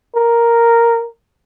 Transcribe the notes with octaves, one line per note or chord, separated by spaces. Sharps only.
A#4